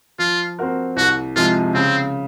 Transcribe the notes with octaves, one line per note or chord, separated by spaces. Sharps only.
F3 F4
C4 F#4 A#4
C2 F#4
C3 F3 G#3 F4
C#3 C4